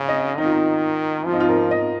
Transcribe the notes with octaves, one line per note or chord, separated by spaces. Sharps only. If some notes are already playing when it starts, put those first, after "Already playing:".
Already playing: C#3 F5
D#5
D#3 D#4
F4
D#4
F3 F4
D#4
F4
A#4
D#5